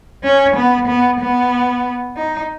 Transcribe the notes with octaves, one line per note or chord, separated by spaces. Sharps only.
C#4
B3
B3
B3
D#4